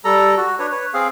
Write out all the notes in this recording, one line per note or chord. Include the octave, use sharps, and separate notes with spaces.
G3 A4 A#5
F#4
D4 B4 C#5
B4 C#5
C4 G#4 F5